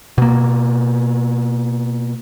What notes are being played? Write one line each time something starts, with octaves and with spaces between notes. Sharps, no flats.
B2 A#3